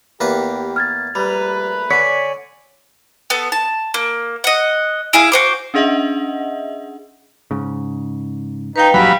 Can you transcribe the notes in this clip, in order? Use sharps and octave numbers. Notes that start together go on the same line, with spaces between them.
E2 A#3 G4 B4
F6 G#6 A6
A#1 G3 A3 B4 A#5
D3 C#5 D5 G#5 B6
B3 A4
A5
A#3
D#5 F#5
E4 G#4 E5 F5
F#4 C5 D6
C#4 D4 G#4 D#5 E5 F#5
G#2 C#3
D#4 B4 F5 G5
A#1 G2 F#3 G3 F5 G#5 B5